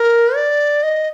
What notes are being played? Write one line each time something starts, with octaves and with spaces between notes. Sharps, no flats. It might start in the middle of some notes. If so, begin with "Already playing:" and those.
Already playing: A#4
D5
D#5